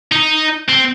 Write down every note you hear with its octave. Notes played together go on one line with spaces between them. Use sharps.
D#4
C4